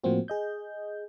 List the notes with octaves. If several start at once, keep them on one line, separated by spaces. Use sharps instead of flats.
A2 F3 A#3 C4 F#4
G#4 D#5 G6